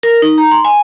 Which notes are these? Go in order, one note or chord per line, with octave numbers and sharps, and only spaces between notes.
A#4
D#4
A#5
C6
G#5